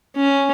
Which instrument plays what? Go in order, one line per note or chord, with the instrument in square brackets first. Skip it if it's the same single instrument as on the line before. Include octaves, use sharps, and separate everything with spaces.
[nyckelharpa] C#4